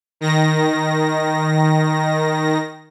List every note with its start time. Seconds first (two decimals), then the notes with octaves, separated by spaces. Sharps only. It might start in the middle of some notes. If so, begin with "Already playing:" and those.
0.21 D#3 A#6